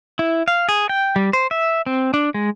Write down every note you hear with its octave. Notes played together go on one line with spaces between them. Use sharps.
E4
F5
G#4
G5
G3
C5
E5
C4
D4
G#3